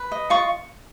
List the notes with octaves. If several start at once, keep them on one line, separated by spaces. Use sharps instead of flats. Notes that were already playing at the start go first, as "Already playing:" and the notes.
Already playing: B4
D#5
F4 C#6